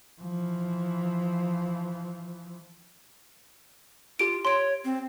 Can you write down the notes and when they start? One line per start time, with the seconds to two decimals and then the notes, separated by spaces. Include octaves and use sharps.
0.22 E3 F3
4.19 F4 G4 D7
4.45 C#5 C6 D7
4.85 C4